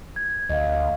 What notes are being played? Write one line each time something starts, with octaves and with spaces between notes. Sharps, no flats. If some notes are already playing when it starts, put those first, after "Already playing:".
G#6
D2 D#5 F5